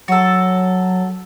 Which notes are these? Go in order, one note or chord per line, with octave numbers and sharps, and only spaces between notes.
F#3 F#4 A4